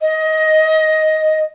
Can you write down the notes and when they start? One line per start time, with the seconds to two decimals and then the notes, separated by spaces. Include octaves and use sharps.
0.01 D#5